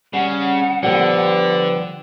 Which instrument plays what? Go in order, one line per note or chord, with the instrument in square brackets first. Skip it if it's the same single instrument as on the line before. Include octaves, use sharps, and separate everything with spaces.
[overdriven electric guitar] C#3 [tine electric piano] G3 [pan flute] F#5
[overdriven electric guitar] D3 [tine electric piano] F3 G4 [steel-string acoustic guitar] G3 B3